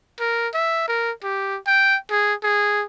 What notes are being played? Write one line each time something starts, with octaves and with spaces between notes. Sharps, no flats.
A#4
E5
A#4
G4
G5
G#4
G#4